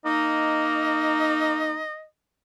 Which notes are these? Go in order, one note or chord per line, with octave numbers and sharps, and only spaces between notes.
A#3 D#4 D#5